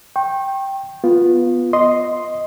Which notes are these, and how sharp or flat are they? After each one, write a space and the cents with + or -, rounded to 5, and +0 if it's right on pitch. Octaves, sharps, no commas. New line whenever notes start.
G5 +0 C#6 -40
B3 +0 F4 +0
D#5 +0 C6 +0